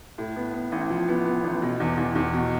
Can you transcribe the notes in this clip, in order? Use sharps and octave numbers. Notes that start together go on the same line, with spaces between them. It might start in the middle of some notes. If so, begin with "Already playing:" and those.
A2
B3
B3
A1
F3
B3
B3
A1
B2
E2
E2
E2
B2